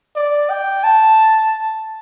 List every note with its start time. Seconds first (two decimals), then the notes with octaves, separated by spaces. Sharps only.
0.16 D5
0.50 G5
0.84 A5